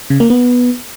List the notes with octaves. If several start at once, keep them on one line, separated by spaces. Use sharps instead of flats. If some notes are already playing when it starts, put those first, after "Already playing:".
C#3
A#3
B3